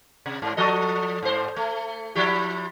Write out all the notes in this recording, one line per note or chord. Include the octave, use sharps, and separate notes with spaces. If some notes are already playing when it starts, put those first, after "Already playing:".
C3
G#2
F3 A4 D#5
G#2 C5
A3
F3 E4 G4